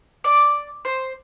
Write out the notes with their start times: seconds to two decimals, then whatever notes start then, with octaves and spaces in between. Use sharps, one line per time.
0.24 D5
0.85 C5